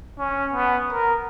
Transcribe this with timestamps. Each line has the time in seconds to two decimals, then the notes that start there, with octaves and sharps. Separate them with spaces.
0.19 C#4
0.53 B3
0.92 A#4